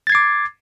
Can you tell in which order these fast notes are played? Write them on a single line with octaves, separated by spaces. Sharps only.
A6 G#6 C7 D6